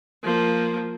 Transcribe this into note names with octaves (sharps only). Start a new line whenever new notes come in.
F3 A#3